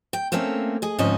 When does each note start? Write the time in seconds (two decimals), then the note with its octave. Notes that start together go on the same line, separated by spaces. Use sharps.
0.13 G5
0.32 A3 A#3 C4 C#4 E4
0.82 G#4 D#5
0.98 D2 G#2 F3 C4 C#4 D#5